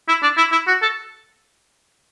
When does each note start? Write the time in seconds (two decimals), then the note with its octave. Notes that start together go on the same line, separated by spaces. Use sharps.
0.08 E4
0.22 D4
0.37 E4
0.52 E4
0.67 F#4
0.82 A4